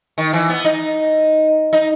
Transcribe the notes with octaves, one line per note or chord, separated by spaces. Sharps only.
D#3
E3
B3
D#4
D#4